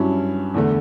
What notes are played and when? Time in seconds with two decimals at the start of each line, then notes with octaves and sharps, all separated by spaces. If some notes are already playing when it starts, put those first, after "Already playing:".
Already playing: G2 F#3 C#4 E4
0.54 E2 D3 A3